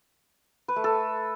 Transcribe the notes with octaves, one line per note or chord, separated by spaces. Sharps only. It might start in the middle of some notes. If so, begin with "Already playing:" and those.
B4
A3
A4